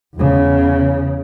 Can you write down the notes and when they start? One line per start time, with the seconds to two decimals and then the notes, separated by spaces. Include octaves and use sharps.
0.16 E2 C#3